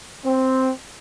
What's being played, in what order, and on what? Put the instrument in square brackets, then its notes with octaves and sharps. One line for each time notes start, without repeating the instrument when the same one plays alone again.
[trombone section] C4